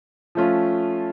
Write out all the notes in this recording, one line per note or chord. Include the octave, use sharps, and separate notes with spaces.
F3 A3 C#4 F4